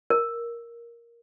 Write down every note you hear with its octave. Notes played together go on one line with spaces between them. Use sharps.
A#4